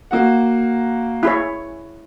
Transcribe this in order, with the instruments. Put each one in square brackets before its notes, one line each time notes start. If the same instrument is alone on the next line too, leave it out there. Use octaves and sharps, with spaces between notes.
[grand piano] A#3 F#4 F#5
[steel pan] E4 G#4 C#5